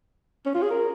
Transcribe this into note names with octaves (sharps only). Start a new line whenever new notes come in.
C#4
F4
G#4
A#4